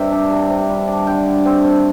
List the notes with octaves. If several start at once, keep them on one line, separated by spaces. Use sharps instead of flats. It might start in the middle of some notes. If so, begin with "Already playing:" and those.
Already playing: G2 C3 C4 E5 G5
D4
C3
C3
G3
D4
D3 G5
D3
C4
C4